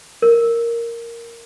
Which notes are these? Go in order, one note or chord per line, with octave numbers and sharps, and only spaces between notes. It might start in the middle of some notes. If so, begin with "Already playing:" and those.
A#4